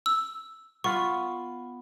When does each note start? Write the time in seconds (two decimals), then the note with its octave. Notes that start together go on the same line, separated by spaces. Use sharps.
0.06 E6
0.84 B3 F4 C#6